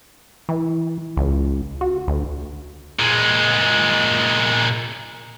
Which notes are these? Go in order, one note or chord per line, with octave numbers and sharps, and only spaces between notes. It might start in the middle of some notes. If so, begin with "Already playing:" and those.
E3
C#2
F#4
D2
A#2 G#3